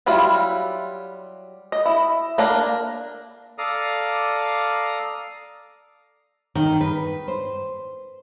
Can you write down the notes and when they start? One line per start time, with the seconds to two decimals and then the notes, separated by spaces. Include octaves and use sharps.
0.06 F#3 G3 E4 F4
1.72 D#5
1.86 E4
2.38 A#3 D4 A#4
3.58 A4 D5 F5 A#5 D#6
6.55 D#3
6.81 B4
7.28 C5